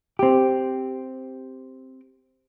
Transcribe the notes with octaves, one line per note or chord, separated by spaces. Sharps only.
C4 G4